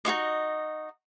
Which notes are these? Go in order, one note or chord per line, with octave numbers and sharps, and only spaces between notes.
D#4 F4 F#4 D#5